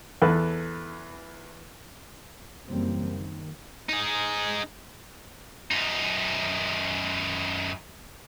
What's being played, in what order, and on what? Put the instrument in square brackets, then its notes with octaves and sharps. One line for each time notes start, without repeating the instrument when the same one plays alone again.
[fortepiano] E2 A4 B4
[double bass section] F#2 C#3 E3 G3 A#3 C4
D#3
[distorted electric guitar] D#4 G#4
F#2 D#4